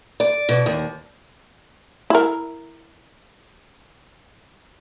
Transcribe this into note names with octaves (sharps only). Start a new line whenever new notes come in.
D5
B2
D#2
E4 A#4